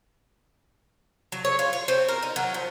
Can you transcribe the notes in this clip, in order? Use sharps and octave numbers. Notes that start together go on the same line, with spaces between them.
F#3
C#5
F4
C#5
C4
A#4
D#4
F#3
F3